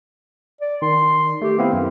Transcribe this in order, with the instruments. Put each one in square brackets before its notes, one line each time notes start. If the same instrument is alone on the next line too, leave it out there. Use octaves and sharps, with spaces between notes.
[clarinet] D5
[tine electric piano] D#3 [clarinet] C6
[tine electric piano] A3 [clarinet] G4
[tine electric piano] B3 C4 E4 [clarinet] F5
[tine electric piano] F#2